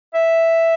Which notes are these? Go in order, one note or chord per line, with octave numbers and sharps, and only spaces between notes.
E5